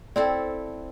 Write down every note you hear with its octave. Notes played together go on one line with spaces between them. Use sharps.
C4 E4 A4 C5 D5